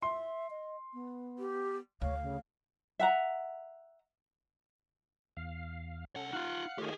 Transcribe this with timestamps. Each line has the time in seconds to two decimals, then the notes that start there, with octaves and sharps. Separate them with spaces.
0.02 E5 C6
0.50 D#5
0.94 B3
1.39 G4
2.02 D2 C#5 F5
2.22 C#3
2.99 E5 F#5 A#5
5.37 E2 F5
6.16 C2 C#4 A4 F#5
6.33 D#4 F4 F5 F#5 F#6
6.78 D#3 A3 F4 G4 G#4 C#5